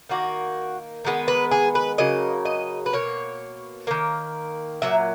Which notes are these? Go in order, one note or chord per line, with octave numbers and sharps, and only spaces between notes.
D#3 A#3 F#4
D#3 G#3 B3
B4
G#4
B4
C#3 F#3 A#3 D#5
D#5
B4
B2 A#3 C#5
D#3 A#3
A#2 F#3 E5